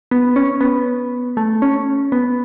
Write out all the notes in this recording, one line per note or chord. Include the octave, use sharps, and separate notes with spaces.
B3
C#4
B3
A3
C#4
B3